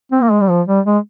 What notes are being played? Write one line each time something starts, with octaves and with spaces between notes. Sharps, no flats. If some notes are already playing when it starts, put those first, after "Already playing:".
C4
A#3
G#3
G3
F3
G3
G#3